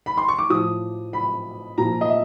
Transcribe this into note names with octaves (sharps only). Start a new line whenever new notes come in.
B5
C6
C#6
D6
A2 F3 D#6
B5
A#2 F3 A#5
D#5
E5